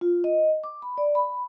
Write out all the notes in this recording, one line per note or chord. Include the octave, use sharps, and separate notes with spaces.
F4
D#5
D6
B5
D5
B5